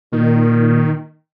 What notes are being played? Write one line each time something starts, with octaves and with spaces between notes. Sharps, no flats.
A#2 D#3